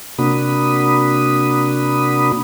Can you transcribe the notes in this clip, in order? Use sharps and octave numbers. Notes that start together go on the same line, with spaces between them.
C3 A#3 D4 F#4 B5 D#6